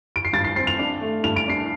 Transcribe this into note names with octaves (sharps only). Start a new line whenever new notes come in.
D7
C7
G2 A6
C7
C4 C7
F7
D4
A3
G2 F7
D7
D4 C7